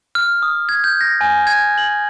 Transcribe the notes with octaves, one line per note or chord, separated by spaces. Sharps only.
F6
D#6
G#6
G6
A#6
G#5
G#6
F#7